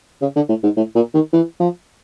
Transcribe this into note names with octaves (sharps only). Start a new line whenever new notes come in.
C#3
D3
A2
G#2
A2
A#2
D#3
E3
F3